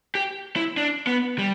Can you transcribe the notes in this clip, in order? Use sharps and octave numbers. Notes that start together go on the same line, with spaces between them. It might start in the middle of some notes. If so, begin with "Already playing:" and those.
G4
E4
D4
B3
G3